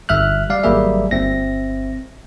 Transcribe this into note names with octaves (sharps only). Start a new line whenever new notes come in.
G1 G3 E5 F6 F#6
G3 D5 F5
G#1 F#3 G3 A#3 G#4 E5
G1 C4 E5 A#6